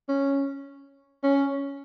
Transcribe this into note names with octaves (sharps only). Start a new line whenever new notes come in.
C#4
C#4